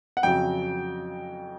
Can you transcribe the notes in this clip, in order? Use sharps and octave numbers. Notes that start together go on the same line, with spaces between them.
F#5
F2 C#3 F#3 G5